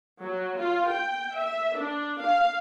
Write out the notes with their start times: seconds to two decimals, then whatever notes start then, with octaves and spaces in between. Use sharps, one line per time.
0.21 F#3
0.58 F4
0.90 G5
1.37 E5
1.77 D4
2.23 F5